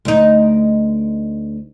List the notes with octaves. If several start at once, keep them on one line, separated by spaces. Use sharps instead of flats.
D2 D#4